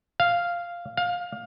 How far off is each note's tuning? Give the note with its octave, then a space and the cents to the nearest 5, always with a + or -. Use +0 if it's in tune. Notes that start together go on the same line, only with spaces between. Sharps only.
F5 -5
F5 +20